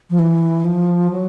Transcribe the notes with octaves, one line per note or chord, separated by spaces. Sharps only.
F3
E3
F3
F#3